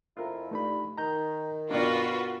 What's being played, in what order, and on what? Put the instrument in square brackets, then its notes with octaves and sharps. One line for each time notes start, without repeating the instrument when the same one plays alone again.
[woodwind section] F2 E4 [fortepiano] F4 A#4
[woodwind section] G2 [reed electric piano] A3 D#4 B5
[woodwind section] D#3 [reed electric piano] A#5 G6
[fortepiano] G2 B2 D4 [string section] F4 F#4 B4 [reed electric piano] A#4